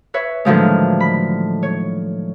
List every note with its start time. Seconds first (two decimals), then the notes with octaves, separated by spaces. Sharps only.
0.14 B4 C#5 E5
0.45 A2 D3 D#3 F3 F#3 G#3
1.00 B5
1.63 C#5